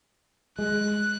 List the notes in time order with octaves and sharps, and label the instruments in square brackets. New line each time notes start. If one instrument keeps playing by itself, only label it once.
[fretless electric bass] G#3 [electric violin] F#6